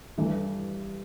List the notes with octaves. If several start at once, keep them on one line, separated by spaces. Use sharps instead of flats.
G2 E3 A3